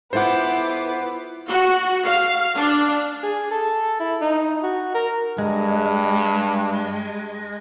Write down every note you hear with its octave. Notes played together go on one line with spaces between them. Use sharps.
B3 E4 F4 A4 B4 C5 F#5 D6
F#4
F5
D4
G#4
A4
E4
D#4
F#4
A#4
G2 G#3